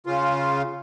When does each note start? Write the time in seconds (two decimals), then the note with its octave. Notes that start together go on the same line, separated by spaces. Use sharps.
0.06 C#3 F4